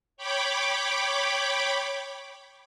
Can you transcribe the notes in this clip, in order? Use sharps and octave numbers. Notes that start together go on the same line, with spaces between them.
C#5 G5 B5 D6